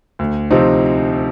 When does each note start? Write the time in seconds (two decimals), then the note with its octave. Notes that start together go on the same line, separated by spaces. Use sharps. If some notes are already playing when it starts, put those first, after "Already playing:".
0.19 D2
0.51 C3 F3 C4 D#4